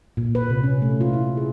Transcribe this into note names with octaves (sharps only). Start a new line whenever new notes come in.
A#2
B4
C3
C#4
A3
F4
E4
G#4